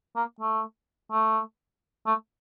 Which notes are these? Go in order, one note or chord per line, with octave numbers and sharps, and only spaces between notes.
A#3
A3
A3
A3